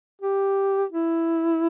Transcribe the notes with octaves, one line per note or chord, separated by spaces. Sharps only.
G4
E4